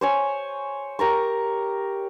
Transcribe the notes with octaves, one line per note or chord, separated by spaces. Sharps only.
C5 C#5 G#5
G4 A#4 A#5 C#6